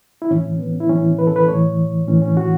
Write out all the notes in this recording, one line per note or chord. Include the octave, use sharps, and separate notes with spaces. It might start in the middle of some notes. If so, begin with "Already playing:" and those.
E4
A2 E3 C#4
B3
E4
A2 E3 C#4
B4
A4
B4
A2 E3 C#5
A2 E3 C#4
C#4
F#4